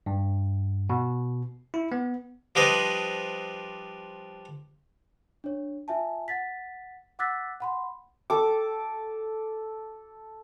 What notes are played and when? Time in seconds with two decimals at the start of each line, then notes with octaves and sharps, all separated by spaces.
0.06 G2
0.90 B2
1.74 E4
1.92 B3
2.55 F3 G3 D4 B4 C5 D#5
5.44 D4 C#5
5.88 F4 E5 G#5 A5
6.28 F#5 A6 B6
7.19 F#5 D6 E6 F#6 A6 B6
7.60 F#5 B5 C6
8.30 A4 D6